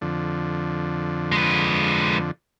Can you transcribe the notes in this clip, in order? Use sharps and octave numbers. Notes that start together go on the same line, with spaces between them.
F2 D3
G#3 B4